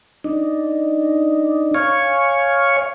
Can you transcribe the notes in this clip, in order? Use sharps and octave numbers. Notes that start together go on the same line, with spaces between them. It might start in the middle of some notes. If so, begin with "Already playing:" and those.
D4 D#4
C#5 F5 G#5 C#6